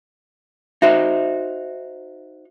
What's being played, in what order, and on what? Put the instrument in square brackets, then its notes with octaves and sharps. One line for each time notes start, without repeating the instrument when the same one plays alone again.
[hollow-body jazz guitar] D#4 F#4 C5 [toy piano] E5